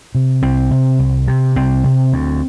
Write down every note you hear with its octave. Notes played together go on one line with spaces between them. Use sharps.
C3
C2 C4
C3
C2
C3
C2 C4
C3
D2